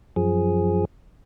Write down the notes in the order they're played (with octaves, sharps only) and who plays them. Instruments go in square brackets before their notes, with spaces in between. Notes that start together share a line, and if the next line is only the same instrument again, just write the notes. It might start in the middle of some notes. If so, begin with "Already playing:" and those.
[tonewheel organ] F#2 F3 G#4